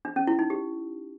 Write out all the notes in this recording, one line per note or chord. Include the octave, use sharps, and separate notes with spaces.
D4
C#4
E4
D#4
G4